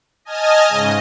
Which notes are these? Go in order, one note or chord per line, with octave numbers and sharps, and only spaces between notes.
D#5 G#5 A5 D#6 F6
G#2 C#3 D#5